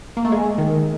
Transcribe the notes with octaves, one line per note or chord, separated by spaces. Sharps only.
A#3
A3
G#3
D#3